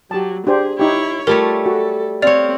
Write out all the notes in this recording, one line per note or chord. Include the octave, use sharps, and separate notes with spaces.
F#3 G4 A5
D4 G4 G#4 C5
D#4 E4 G4 C#5
G3 A3 F4 A#4 C#5
F#4 A4
C4 C#5 D5 F5